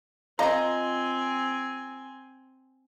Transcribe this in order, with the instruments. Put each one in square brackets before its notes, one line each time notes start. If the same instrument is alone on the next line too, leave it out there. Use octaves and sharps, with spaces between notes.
[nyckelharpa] C4 G#5 [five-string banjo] F4 D#5 F5 [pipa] A#4 A#5